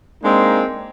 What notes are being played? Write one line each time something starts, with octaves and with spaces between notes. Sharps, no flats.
G#3 A#3 C4 D4 D#4